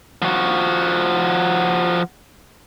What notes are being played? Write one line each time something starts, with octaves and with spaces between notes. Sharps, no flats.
F3 F#4